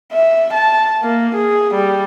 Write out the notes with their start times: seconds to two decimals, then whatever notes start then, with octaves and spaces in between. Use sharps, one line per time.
0.12 E5
0.53 A5
1.03 A#3
1.35 G#4
1.74 G3